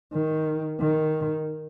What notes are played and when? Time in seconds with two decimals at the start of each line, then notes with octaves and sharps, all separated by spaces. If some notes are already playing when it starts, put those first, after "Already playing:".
0.13 D#3
0.80 D#3